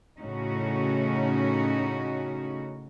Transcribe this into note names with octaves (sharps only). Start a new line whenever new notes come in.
A2 C#3 C#4 D#4 F#4